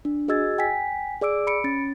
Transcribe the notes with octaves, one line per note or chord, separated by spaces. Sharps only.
D4
F#4 G#4 D#5 E6 G#6 A6
G5 G#5 B6
G#4 D5 D6 E6 D7
B5 C#7 D7
C#4 A6